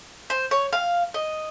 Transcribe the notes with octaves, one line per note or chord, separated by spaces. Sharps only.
C5
C#5
F5
D#5